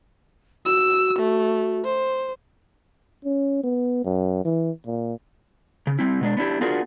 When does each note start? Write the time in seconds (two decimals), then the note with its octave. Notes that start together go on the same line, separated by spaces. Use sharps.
0.66 F#4 E6
1.20 A3
1.85 C5
3.25 C#4
3.63 B3
4.04 F#2
4.45 E3
4.86 A#2
5.87 C#3
5.99 G3 C4 E4
6.21 B2 G#3 D4
6.37 B3 D4 E4 G4
6.61 B3 D4 F4 F#4 G#4 A#4